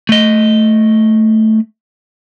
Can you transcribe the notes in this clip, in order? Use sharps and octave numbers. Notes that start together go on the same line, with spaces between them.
A3 D#5